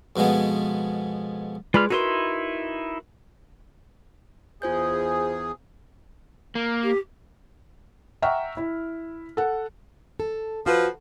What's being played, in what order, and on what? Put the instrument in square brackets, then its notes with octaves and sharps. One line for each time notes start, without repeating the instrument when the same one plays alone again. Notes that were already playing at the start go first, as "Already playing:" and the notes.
[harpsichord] F2 B2 F3 G#3 B3
[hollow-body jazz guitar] G#3 B4 D5 [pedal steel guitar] F4 B5 F6
[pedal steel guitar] D#4 E4 C6 [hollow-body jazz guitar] F#4 A#4 B4
[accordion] E2 G#4 [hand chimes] F4 C5 G6
[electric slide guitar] A#3
[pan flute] G4
[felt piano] E5 F#5 G5 A#5 C#6 F6
E4
A4 F#5
[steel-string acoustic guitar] A4
[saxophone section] F3 B4 [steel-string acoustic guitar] F#4